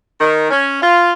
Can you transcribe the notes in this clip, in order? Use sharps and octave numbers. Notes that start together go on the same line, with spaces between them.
D#3
C#4
F4